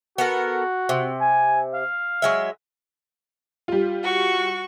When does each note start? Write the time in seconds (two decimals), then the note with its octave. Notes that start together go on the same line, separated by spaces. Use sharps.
0.18 B3 F#4 A4 A#4
0.89 C3
1.20 G#5
1.74 F5
2.22 F#3 G#3 E5
3.68 G3 F4
4.03 F#4 C#6